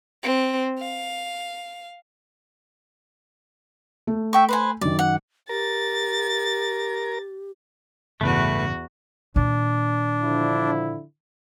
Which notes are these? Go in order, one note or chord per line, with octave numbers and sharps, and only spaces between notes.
C4
F5
A3
E5 G5 C#6
B4 C5 G#5
F#2 D#3 D5
F#5
G4 A#4 A6
A1 E2 G2 C#3 A3 F#4 B4
A#2 D#3 D4
D3 F3 E4